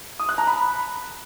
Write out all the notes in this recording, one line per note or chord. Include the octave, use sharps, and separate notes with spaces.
D#6
F#6
A#5
B5